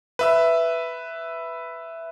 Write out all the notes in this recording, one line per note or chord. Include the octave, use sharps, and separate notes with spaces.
B4 E5 E6